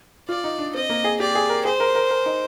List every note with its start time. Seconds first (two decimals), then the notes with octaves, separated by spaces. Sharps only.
0.29 F4 D5
0.44 D#4
0.59 D4
0.74 C4 D#5
0.90 A#3
1.04 G#4
1.20 G4 D5
1.35 G#4
1.49 A#4
1.65 G#4 C5
1.80 A#4
1.95 A#4
2.10 A#4
2.26 D#4